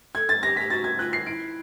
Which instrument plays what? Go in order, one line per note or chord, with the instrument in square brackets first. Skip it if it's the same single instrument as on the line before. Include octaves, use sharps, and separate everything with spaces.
[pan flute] A4 [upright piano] G#6
[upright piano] A6
[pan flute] G4 [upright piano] A#6
[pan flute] G4 [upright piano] B6
[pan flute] F#4 [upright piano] A6
[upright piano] G#6
[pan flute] F4 [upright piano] F#6
[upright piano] C7
[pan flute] E4 [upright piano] D7